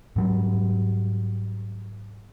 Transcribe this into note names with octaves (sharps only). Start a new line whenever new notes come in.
G#2 F#3 G3